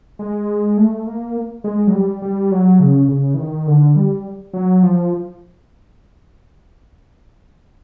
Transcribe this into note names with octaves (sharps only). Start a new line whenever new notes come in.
G#3
A3
A#3
G#3
F#3
G3
G3
F#3
C#3
C#3
E3
D#3
D3
G3
F#3
F3